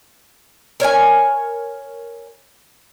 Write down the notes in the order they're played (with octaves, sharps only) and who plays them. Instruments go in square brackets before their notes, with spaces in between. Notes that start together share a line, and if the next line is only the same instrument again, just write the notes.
[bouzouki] A#4 C#5 E5 G#5